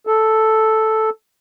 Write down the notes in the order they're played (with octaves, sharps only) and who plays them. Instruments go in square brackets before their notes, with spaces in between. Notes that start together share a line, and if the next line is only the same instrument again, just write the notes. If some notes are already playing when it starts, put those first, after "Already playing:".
[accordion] A4